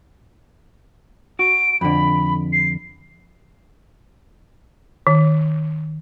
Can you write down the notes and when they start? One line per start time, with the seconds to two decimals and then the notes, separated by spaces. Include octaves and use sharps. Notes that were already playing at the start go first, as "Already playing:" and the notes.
1.39 F#4 D7
1.81 F2 D3 B5
2.53 C7
5.07 D#3